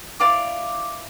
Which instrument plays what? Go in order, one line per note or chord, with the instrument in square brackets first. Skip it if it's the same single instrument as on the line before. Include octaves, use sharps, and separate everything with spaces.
[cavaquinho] E4 D5 F5 D6